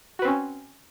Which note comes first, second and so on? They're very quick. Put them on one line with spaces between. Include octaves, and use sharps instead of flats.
F#4 B4 C4 C#4